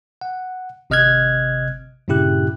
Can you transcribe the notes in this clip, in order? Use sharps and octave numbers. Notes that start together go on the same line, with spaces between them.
F#5
G#1 C3 D#5 F6 F#6 G#6
G2 A#2 C#3 E4 G4 F#6